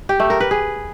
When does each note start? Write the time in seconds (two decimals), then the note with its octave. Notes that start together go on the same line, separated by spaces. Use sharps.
0.09 G4
0.20 A3
0.30 A#4
0.40 B4
0.51 G#4